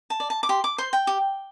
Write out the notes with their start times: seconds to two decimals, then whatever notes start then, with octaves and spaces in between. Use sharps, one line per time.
0.10 A5
0.20 D5
0.30 A5
0.43 D6
0.49 G4 C6
0.64 D6
0.78 C5 C6
0.93 G5
1.07 G4